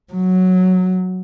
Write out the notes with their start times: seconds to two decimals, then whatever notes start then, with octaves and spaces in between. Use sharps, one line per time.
0.13 F#3